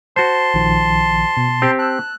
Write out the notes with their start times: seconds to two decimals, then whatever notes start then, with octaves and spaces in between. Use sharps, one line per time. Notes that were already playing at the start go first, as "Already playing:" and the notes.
0.16 F#4 C5 A5 C6
0.54 A#1 D#3 F3
1.37 B2
1.62 C4 G4
1.79 A5 E6 F#6